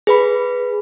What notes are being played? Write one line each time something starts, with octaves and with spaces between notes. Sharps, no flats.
G#4 B4 B5